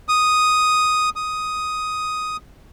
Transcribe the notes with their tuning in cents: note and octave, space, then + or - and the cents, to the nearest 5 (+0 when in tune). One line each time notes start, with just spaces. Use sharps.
D#6 +0
D#6 +5